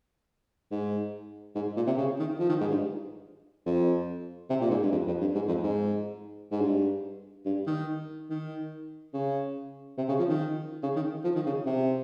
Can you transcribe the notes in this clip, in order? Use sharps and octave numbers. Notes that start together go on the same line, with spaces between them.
G#2
G#2
A#2
C3
C#3
D#3
F3
D#3
G#2
G2
F2
C3
A#2
G#2
G2
F2
F2
G2
G#2
F2
G#2
G#2
G2
G2
D#3
D#3
C#3
C3
C#3
F3
D#3
C#3
D#3
F3
D#3
C#3
C3